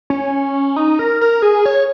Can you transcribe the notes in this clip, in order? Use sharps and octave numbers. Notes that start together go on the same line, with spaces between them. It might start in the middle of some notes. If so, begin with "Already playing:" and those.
C#4
D#4
A#4
A#4
G#4
C#5